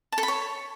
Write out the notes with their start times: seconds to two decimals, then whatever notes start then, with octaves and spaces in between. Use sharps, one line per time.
0.12 A5
0.18 A4
0.23 B5
0.28 C#5